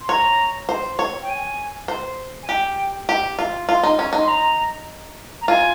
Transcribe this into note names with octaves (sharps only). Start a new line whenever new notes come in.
C6
C#5 A#5
C5
C#5
G5
G#5
C5
G#5
G4 G5
G4
F4
F4 C6
D#4
C#4
D#4
C6
A#5
A#5
F4 G#5